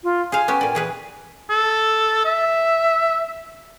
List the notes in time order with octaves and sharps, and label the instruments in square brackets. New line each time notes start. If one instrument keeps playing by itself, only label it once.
[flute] F4
[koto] G#4 C5 F5 [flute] G#5
[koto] B3 C#4 G4
A#2 D5
E3 G#4 B4
[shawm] A4
E5